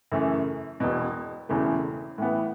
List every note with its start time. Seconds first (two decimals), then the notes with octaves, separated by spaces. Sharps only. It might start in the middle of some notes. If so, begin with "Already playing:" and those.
0.12 F#2 C#3 E3 A3 C#4
0.80 E1 E2 B2
1.49 E1 E2 C#3 E3 A3
2.18 A2 E3 B3